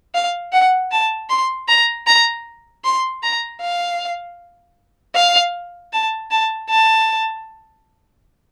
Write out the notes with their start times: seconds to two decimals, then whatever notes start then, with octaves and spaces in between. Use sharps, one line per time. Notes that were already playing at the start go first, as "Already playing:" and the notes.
0.15 F5
0.52 F#5
0.92 A5
1.30 C6
1.68 A#5
2.07 A#5
2.85 C6
3.23 A#5
3.61 F5
5.15 F5
5.93 A5
6.31 A5
6.70 A5